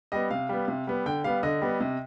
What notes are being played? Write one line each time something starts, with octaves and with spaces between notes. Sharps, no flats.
G3 B3 D#5
C3 F5
G3 B3
C3
G3 B3
D3 G5
G3 B3 F5
D3 D#5
G3 B3
C3